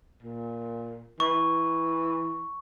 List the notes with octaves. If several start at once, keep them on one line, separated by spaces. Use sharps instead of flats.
A#2
E3 C#6